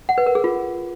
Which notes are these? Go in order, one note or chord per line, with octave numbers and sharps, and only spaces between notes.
F#5
B4
A#4
G#4
F4